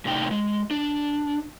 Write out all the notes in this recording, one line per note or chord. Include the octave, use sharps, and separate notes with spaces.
A2 C3 D#4 G5
G#3
D4